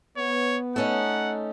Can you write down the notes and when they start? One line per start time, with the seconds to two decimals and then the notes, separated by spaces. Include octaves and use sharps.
0.17 B3 C#5
0.76 A3 C#4 D#4 F#5